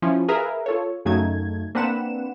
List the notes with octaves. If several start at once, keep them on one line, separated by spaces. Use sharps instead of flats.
F3 C#4 E4
G#4 A#4 B4 E5 F5
F4 A4 C#5
F#2 C#3 F#3 A3 D#4 G#6
A#3 C4 D4 B4 F#5 E7